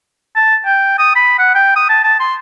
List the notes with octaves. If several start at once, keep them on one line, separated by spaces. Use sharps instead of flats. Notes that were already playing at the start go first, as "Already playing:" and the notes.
A5
G5
D#6
B5
F#5
G5
D#6
A5
A5
C6